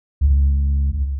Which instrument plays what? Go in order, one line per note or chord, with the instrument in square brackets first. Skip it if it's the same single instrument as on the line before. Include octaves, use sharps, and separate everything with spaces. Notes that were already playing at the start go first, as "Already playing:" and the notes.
[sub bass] C#2